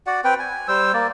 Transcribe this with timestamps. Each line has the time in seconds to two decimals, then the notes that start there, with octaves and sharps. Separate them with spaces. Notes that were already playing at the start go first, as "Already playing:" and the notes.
0.07 F#4 D5 F#5
0.24 C4 B4 G5
0.39 G#5
0.68 G3 C5 E6
0.93 A#3 D5